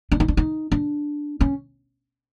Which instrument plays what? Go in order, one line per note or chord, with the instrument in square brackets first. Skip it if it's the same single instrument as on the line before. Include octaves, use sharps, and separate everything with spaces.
[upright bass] D4
D#4
D4
D#4
D4
C#4